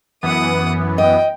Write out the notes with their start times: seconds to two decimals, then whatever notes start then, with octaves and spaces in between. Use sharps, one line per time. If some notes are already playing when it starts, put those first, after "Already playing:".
0.23 F#2 E3 B3 F#5 D#6
0.98 D#5 G5